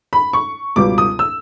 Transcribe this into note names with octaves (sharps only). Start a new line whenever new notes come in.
B5
C#6
C#2 B2 G3 B3 D6
D#6
E6